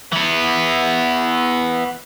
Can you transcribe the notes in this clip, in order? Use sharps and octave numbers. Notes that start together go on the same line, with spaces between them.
E3 B3